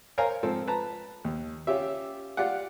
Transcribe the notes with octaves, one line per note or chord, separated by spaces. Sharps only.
A#4 C5 C#5 F5 G#5 A#5
G#2 F3 C4 A4
B4 A5 A#5
D#2
C#4 F4 G4 E5
F4 G4 D5 F5 F#5